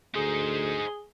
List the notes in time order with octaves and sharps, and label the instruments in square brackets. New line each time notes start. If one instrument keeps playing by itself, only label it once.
[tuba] D2 [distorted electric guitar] D#4 C5 [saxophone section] G#4